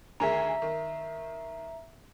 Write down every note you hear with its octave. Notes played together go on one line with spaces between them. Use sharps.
D2 D#3 G#4 E5 A#5
D#3